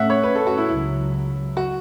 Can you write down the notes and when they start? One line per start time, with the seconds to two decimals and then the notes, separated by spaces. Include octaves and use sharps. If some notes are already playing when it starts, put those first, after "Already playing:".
Already playing: A2 A3 C#4 E5 F#5
0.10 C#5
0.23 B4
0.35 A4
0.47 F#4
0.58 E4
0.68 C#2 C#3 F#3 E4
1.57 F#4